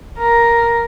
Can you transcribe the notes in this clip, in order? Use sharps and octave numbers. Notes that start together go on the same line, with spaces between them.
A#4